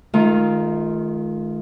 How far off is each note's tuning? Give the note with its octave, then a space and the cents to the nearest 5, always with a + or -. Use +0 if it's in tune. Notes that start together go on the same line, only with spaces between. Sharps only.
D#3 +0 A3 -45 F4 +0